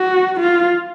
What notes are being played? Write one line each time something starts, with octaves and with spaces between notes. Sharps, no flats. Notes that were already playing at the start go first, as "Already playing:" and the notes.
Already playing: F#4
F4